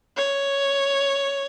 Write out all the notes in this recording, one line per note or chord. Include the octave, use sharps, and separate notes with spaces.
C#5